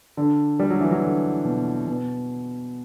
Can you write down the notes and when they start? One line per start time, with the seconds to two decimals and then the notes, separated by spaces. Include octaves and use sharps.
0.17 D3
0.59 G3
0.70 F#3
0.81 E3
0.91 F#3
1.03 D3
1.45 B2
1.87 B2